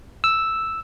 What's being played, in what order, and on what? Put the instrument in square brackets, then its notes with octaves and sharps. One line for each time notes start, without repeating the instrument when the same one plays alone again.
[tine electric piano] E6